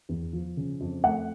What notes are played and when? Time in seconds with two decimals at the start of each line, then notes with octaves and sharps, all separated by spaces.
0.09 E2
0.33 F3
0.57 C#3
0.81 F2
1.04 A3 F#5